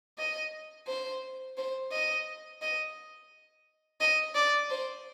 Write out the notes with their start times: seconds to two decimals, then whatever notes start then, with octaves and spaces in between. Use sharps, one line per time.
0.18 D#5
0.88 C5
1.57 C5
1.92 D#5
2.62 D#5
4.01 D#5
4.35 D5
4.71 C5